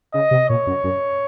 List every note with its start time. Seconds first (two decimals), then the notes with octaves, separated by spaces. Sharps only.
0.13 C#3 D#5
0.31 C3
0.50 A#2 C#5
0.67 F#2
0.84 F#2